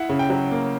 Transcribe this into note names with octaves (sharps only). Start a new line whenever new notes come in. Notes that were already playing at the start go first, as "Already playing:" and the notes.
Already playing: E4 F#5
C#3
G5
F#3
A#3